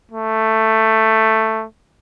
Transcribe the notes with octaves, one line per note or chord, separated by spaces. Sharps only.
A3